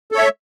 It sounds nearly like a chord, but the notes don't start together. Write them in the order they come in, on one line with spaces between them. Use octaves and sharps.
A4 C#5 E5